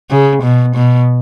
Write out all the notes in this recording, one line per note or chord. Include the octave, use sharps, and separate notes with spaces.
C#3
B2
B2